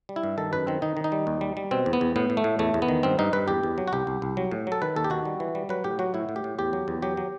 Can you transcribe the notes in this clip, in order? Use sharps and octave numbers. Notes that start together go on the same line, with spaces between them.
G3
E4
G2
D#3 A4
F#2 B4
D#3 C4
D#3 D#4
D#3
D#4
G3
D#2
G3
G3
B2 C4
E2
B3
E2
A2 B3
A2
A3
A2
E2 A3
E2
B3
D#3
G2 C4
G2 D#4
G2 B4
E2 G4
E2
F#3
F#4
C2 G4
C2
C2
F#3
A2
F#3 A4
D#3 B4
D#2 A4
G4
D#3 F#4
G3
E3
G3
F#3 B4
A2 G4
F#3 F#4
A2 E4
A2
G4
A2
E2 G4
F#3
E2
F#3 G4
F#3